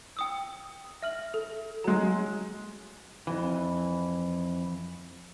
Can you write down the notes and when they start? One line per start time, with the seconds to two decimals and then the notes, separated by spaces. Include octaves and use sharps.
0.17 G5 D#6 E6
1.02 E5 F6 F#7
1.34 A4
1.84 F#3 G#3 A#5
3.27 F2 E3